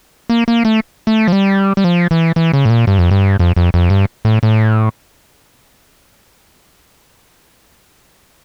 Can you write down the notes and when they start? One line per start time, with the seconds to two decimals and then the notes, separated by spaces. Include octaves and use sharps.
0.30 A#3
0.48 A#3
0.65 A3
1.07 A3
1.28 F3
1.32 G3
1.77 G3
1.84 F3
2.11 E3
2.36 E3
2.53 C#3
2.65 A2
2.70 A#2
2.87 G2
2.99 F2
3.11 G2
3.40 F2
3.57 F2
3.74 F2
3.90 G2
4.25 A2
4.43 A2